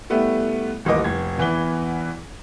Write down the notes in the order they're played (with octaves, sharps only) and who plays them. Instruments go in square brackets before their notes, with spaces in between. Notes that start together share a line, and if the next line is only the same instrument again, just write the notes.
[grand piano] G3 A3 B3 E4
D#1 A1 A#3 D#5 D6
F1 G#6
E2 E3 B3 G7